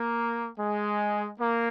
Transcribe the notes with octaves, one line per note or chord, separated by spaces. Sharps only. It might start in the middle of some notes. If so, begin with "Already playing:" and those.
Already playing: A#3
G#3
A#3